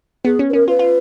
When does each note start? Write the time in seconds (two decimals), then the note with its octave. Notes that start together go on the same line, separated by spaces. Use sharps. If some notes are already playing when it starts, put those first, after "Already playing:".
0.25 B3 G#4
0.39 C#4
0.49 B4
0.53 C#4 A#4
0.68 F4 B4
0.79 F4